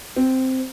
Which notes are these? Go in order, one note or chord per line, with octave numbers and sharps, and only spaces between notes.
C4